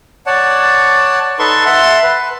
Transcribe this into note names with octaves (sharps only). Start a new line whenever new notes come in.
C#5 D5 F#5 A5
D#4 A4 B4 A5 C6 C#6
E5 F#5 A5 C6
B4